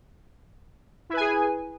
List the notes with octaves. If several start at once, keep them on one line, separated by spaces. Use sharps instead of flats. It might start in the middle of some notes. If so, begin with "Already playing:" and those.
E4 G#4 B4 G#5